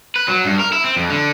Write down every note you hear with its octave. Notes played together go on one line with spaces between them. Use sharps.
B4
F#3
G2
A#4
E4
C4
F2
D3